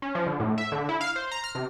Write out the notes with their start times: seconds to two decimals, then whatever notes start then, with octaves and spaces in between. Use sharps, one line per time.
0.02 C#4
0.15 F3
0.27 D3
0.40 A2
0.58 E5
0.72 D3
0.89 E4
1.01 F5
1.16 C5
1.31 A#5
1.44 F6
1.55 C3